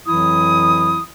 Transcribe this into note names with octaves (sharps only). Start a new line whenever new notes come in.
F2 E3 F#3 E4 D#6